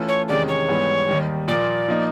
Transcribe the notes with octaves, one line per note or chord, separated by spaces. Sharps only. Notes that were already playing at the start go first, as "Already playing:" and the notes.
Already playing: E3 A3 C#4 F4 A4
C#5
E2 C3 D#3 G#3 C#4 D5
C#5
G#2 E3 G3 B3
D#2 D#3 G3
A#2 F3 A#3 D5
F3 A#3 D#4